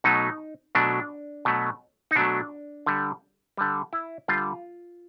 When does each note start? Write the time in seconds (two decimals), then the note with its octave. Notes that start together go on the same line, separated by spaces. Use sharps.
0.04 B2 F#3 A3 D#4
0.75 B2 F#3 A3 D4
1.45 B2 F#3 A3
2.11 D#4
2.16 B2 F#3 A3 D4
2.86 D3 G3
3.57 D3 G3
3.93 E4
4.28 D3 G3 F4